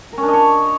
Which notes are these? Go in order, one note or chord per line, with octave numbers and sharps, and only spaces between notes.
A#4
C#4
D4
D#5
C#5